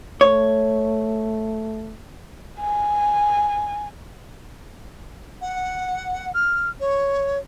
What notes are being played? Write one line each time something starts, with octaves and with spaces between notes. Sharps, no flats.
A3 C#5
G#5
F#5
F6
C#5